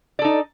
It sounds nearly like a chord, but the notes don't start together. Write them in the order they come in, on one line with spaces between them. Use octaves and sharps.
D5 A4 D#4